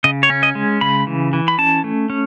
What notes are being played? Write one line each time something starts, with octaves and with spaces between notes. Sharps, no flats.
C#3 D#5
C#5
C#4
D#5
G#3
C#3 B5
E3
E3
B5
C#4 A5
A3
C#4